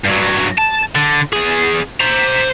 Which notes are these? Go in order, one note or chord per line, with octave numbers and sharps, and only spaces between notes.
G2 F#3
A5
D3
E2 G#4
C5 A#5